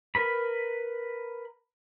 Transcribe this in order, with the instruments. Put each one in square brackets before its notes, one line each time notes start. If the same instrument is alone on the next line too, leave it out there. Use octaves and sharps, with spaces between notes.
[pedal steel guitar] A#4 B4 B5